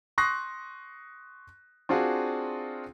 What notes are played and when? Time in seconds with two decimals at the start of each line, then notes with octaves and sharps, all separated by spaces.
0.18 C6 C#6 D#6 F#6 A#6 C7
1.89 C4 D4 F4 F#4 G#4